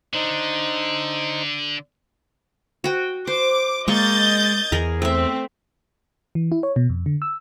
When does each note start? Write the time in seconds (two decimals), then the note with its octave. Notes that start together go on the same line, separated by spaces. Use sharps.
0.14 D3 D#4 C5
2.84 F#4 G5
3.27 C5 D6
3.88 G#3 A#3 D#5 C#6 G6 A6
4.72 E2 G#4 A#4
5.02 A3 C4 E5
6.35 E3
6.52 E4
6.63 C#5
6.76 B2
6.89 F2
7.06 D3
7.22 E6